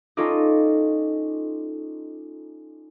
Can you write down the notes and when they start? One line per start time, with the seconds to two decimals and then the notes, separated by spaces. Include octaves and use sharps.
0.17 C#4 D#4 F4 A4 D5 D#5